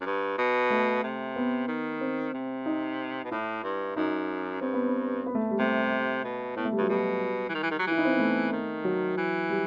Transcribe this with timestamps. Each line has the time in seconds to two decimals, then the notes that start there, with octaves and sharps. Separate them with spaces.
0.01 F#2
0.06 G2
0.38 B2
0.70 A3
1.03 C3
1.36 B3
1.68 D#3
2.01 C4
2.34 C3
2.66 D#4
3.24 B2
3.31 A2 E4
3.64 G2
3.96 F#2 D#4
4.61 G2 C4
4.74 B3
4.86 C4
5.26 B3
5.35 A3
5.51 G3
5.59 C3 A3
6.24 B2
6.56 A2 B3
6.65 A3
6.72 G3
6.78 G2 F#3
6.89 B2 G3
7.49 E3
7.55 D#3
7.63 E3
7.71 D#3
7.79 F#3
7.87 E3 E4
7.98 D#4
8.05 C4
8.12 B3
8.20 A3
8.52 D#3
8.85 F#3
9.17 E3
9.50 G3